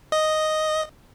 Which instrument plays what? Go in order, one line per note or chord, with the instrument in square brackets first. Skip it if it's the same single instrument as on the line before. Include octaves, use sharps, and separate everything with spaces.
[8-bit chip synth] D#5